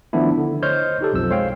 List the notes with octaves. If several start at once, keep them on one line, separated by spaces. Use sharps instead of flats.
D#3 F3 A3 B3 D4 E4
D3
C5 C#5 D#5 F6 G6
D#4 G4 A4
B1 F2 F3 E6
G#3 C5 C#5 F5 G5